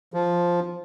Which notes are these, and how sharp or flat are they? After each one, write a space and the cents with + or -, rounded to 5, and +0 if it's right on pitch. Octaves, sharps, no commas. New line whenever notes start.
F3 +0